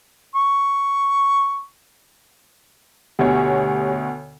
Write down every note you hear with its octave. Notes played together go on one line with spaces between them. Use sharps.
C#6
D2 B2 G4 C#5 G#5